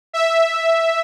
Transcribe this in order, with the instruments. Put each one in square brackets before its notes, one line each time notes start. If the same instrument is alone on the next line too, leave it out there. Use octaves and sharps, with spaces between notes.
[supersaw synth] E5